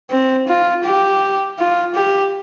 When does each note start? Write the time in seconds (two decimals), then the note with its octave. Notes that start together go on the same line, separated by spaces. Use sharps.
0.10 C4
0.48 F4
0.85 G4
1.58 F4
1.95 G4